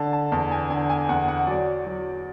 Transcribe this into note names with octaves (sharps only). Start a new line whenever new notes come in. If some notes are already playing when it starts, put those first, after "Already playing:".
Already playing: D3 A5
A5
E2 A5
G#5
D3 G#5
G#5
E2 F#5
F#5
F#3 D5
F#3